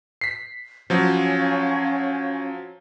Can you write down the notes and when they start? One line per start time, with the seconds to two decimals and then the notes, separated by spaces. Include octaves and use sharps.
0.21 B6 C7
0.90 F3 F#3 C#4 C#5 F5